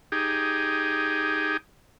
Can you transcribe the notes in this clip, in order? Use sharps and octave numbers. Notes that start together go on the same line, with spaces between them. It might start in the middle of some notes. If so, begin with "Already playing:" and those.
D#4 G4 G#4